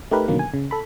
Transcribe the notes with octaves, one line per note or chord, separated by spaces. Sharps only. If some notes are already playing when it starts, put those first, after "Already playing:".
A3 D#4 G4 A#4 B4
B2 D3 D#3 F#3 A#3 C#4
G#5
C#3
A4 B5